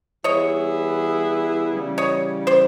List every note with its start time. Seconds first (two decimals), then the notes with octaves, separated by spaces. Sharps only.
0.24 E3 G3 B3 E4 G#4 C#5 D#5
1.73 C#3 E3 G3
1.98 C#5 D#5
2.47 C5 D5